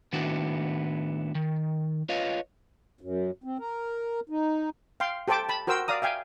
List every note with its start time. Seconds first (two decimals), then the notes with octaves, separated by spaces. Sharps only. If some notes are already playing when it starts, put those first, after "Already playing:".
0.13 A2 D#3 B3 D4 E4 F#4
1.35 D#3
2.09 F4 B4 C#5 D#5 F5
3.01 F#2
3.44 C4
3.59 A#4
4.29 D#4
5.00 F5 G5 C6
5.28 G4 A4 C5 G5 A5 D6
5.49 A5 B5
5.67 F#4 A#4 C5 G5 E6
5.88 D5 F5 A#5 D#6
6.02 E5 F5 G5 G#5